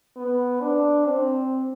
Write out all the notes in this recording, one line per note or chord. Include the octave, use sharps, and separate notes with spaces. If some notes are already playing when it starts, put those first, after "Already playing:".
B3
D4
C4